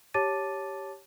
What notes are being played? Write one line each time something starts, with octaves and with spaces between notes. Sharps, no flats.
G4 C#5 A5 D6 A6 D#7